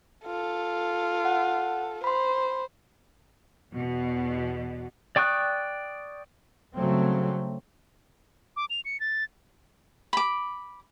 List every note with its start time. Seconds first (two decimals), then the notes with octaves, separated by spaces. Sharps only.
0.26 F4 A4
1.25 F#5
2.04 C5 B5 C6
3.73 E2 B2
5.16 D5 G5 C#6 D#6 F#6
6.75 C#3 F#3 G3 A3 C4
8.56 D6
8.70 F7
8.85 C#7
9.00 A6
10.13 B5 D6